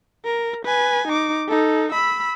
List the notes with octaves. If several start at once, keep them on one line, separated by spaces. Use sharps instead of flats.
A#4
B4 G#5
D#4 D6
D#4 A4
B5 E6